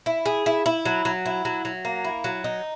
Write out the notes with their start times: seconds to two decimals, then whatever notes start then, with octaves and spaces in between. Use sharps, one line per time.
0.06 E4
0.26 G#4
0.46 E4
0.66 E4
0.86 F#3
1.05 F#3
1.26 E4
1.45 F#3
1.65 F#3
1.85 A#3
2.05 E4
2.24 F#3
2.44 D#4